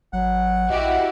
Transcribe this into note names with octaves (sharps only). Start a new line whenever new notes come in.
G#1 F#3 F#5
A#1 E4 F#4 G4 D#5